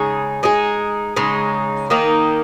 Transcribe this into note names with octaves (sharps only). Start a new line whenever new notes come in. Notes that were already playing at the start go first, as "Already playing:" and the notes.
Already playing: C#3 G#3 D#4 G#4
G#3 D#4 G#4
C#3 G#3 D#4
D#3 A#3 D#4